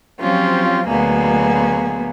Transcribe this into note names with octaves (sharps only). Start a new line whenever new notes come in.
F3 F#3 C4 C#4 F4 G4
D2 B2 F#3 A#3 B3 G#4